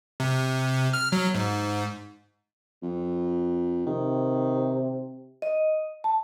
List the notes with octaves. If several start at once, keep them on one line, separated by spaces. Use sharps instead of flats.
C3
F6
F#3
G#2
F2
C3 D#3
D#5
A5